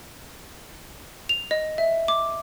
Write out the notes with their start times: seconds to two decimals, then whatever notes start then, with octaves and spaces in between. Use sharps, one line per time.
1.29 F7
1.51 D#5
1.78 E5
2.08 D6